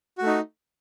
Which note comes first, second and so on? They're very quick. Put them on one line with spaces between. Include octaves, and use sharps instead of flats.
F#4 A3 D#4